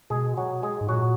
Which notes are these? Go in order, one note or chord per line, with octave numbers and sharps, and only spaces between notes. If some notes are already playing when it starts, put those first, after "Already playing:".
B2 G#3 G#4
F#3 F#4
G#3 G#4
G#2
A#2 F#3 F#4